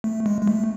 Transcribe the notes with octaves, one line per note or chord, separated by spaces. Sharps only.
A3
G#3
G#3
A3